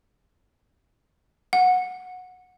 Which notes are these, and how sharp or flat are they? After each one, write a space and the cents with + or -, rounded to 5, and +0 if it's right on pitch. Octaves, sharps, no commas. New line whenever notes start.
F#5 -15